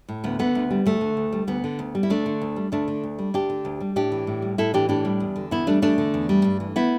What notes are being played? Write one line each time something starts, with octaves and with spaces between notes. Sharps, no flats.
A2
D2 B3
D3 B3
D2
G3
D2 A3
D3
D2
G3
D2 B3
D3
D2
G3
E4
D2 A3 D4
D3
D2
G3
D2 A3 D4
D3
D2
G3
D2 D4 G4
D3
D2
G3
A2 D4 G4
E3
A2
G3
A2 E4 A4
E3 D4 G4
A2 D4 G4
G3
E2
D3
E2 B3 E4
G3 A3 D4
E2 A3 D4
D3
E2
G3
G2
E3
B3 E4